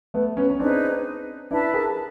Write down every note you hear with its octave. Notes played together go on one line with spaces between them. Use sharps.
A3 B3
B3 C#4
C#4
C4 D4 D#4 G#4 B4
D4 E4 B4 E5 A5
G#4 A#4